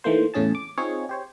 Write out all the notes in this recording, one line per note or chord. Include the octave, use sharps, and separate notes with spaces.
D#3 E3 A3 A#3 C5
E2 A2 C#3 C#4 G#4 A5
D6
C4 D#4 F4 G#4 C#5
G4 C5 C#5